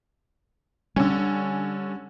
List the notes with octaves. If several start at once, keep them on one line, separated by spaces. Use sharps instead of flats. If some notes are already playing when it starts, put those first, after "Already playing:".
D3 G3 C#4